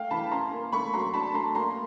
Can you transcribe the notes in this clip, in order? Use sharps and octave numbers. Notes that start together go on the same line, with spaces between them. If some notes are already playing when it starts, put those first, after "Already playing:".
Already playing: A3 F5 G5
E3 A5 B5
C#4 A#5 C6
A#3
A3 B5 C#6
F#3 A#5 C6
D4 A5 B5
A3 A#5 C6
A#3 A#5 C6